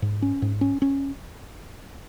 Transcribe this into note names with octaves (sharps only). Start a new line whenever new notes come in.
G#2
C#4
G#2
C#4
C#4